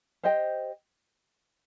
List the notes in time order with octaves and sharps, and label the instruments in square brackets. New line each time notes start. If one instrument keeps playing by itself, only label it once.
[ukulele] G4 C5 D#5 G5